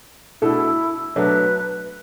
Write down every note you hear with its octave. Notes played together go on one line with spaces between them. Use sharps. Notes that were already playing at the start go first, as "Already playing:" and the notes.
B2 A3 D4 E4 A4
B2 F#3 A3 D4 B4